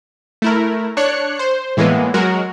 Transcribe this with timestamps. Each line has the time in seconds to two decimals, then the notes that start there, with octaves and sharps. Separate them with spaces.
0.42 A3 E4 A#4
0.97 D4 C#5 F#6 C#7
1.39 C5
1.77 A2 E3 G#3 A#3 B3
2.14 F#3 G#3 F#4 A#4